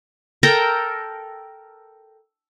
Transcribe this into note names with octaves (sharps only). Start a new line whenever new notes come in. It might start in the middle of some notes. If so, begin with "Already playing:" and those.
A4 A#4 G5 A#5